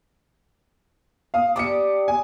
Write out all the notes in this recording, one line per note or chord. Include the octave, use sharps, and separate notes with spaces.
F5 D#6
G3 D4 G4 D6 D#6 C#7
G#5